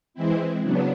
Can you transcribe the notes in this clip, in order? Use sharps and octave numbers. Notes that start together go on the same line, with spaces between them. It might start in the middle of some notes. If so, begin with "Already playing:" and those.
E3 G#3 C4 E4
C#3 F#3 B3 D4